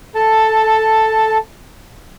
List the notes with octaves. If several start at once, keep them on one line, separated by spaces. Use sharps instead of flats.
A4 A5